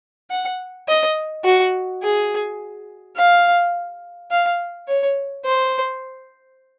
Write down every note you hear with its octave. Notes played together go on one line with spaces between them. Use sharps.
F#5
D#5
F#4
G#4
F5
F5
C#5
C5